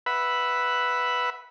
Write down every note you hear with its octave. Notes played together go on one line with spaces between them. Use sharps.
B4 E5 F#5 B5